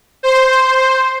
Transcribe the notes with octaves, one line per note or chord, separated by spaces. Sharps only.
C5